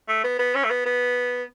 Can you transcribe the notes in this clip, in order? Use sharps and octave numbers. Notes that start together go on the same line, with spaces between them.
A3
B3
B3
C#4
A3
B3
B3